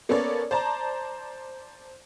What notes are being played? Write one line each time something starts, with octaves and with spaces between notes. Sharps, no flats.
A#3 B3 C#4 A4 C#5 D5
C5 D5 A5 A#5